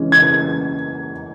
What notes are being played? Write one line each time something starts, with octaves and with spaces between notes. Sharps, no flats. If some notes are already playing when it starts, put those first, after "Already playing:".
Already playing: C#3 E3 G#3 C#4
G#6